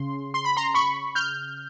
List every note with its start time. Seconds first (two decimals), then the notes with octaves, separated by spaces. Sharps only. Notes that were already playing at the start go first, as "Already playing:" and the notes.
Already playing: C#3 C6
0.34 C6
0.45 B5
0.57 A#5 C6
0.75 B5 C#6
1.15 F6 G6